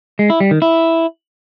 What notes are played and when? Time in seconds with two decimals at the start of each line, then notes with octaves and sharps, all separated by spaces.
0.19 G#3
0.30 E4
0.40 G3
0.51 D#3
0.62 E4